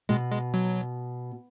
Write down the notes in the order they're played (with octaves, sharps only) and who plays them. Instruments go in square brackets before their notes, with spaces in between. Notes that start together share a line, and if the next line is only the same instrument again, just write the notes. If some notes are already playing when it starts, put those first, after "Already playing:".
[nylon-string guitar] B2 [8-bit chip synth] G#3
[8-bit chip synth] G#3
F#3